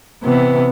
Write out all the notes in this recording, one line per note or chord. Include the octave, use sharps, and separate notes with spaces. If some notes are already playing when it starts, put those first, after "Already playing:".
C3 E3 B3